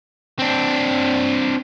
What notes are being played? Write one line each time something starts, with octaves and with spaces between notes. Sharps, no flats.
C4 D4